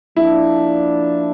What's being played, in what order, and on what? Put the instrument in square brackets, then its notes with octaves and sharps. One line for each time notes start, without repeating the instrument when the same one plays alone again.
[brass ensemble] F3 A#3 D4 [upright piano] E4